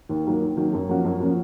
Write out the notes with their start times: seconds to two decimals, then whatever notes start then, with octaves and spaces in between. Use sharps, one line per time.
0.09 D#2
0.26 D#3 F#3 A#3
0.42 D#2
0.57 D#3 F#3 A#3
0.73 F#2
0.89 F3 A#3 C#4 F#4
1.05 F#2
1.20 F3 A#3 C#4 F#4